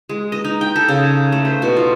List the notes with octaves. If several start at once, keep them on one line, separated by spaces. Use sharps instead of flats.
G#3
D#5
D#4
G5
A4
C#3
A3
C5
B2
F4